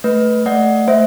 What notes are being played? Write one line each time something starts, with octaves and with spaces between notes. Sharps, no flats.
A3 B4
A3 D5 F#5
A3 C5 E5